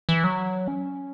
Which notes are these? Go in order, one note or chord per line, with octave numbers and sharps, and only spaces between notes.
E3
F#3
C#4